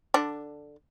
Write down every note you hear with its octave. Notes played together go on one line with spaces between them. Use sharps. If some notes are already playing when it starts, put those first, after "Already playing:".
D3 D4